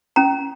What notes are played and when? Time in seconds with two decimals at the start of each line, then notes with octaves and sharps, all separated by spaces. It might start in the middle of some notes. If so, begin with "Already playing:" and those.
0.16 C#4 A#5